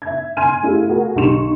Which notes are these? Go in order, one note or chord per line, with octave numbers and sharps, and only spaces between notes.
E5 G#6
G#5 C6 F6 G#6 D#7
A3 E4 F4 G4 G#4
A3 F4 F#4 G#4 A#4
B1 D3 G4 C6 C#6 E7